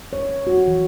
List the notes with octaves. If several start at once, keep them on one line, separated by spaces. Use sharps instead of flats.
C#5
F#4
E3